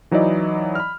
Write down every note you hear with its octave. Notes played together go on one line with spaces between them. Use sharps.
E3 F#3 D#4 E4 D5 D#5
B5 F6